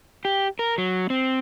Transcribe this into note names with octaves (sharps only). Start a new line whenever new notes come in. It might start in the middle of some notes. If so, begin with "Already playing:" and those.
G4
A#4
F#3
C4